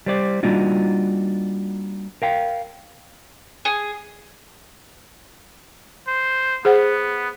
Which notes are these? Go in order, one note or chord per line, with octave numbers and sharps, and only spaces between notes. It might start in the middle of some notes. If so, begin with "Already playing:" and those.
G3 C5 D5
G3 A#3 D4 D#4 F4 F#4
A#4 F5 G5
G#4
C5
B3 G#4 C5 F#5